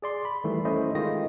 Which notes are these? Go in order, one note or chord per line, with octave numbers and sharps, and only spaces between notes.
G#4 D5 C6
B5
D#3 E3 G3 A3 E4
A3 C#4 E4 C5 D#5
D#3 G#3 F4 D#5 A#6